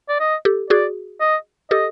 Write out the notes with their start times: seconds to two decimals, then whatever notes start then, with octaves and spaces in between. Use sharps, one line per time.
0.09 D5
0.20 D#5
0.45 G4 A4
0.70 F#4 G#4 D5
1.21 D#5
1.71 G4 A4 D#5